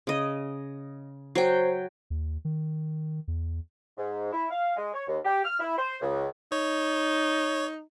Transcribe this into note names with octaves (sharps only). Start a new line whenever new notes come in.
C#3 D#5
F#3 C5 G5
D#2
D#3
E2
G#2
E4
F5
G#3
C#5
D#2
G4
F6
E4
C5
C#2
D#4 C#5